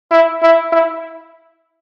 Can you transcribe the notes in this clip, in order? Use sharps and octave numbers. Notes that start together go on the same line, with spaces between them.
E4
E4
E4